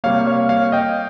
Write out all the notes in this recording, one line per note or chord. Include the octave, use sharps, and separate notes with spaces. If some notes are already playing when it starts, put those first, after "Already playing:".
C3 G3 A#3 C#5 F5
C#5 F5
C#5 F5
D#5 G5